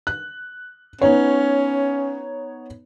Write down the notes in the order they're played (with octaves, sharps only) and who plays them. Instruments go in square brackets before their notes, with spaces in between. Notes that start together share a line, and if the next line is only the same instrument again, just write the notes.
[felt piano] F#6
[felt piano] B3 D#4 C#5 [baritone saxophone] C#4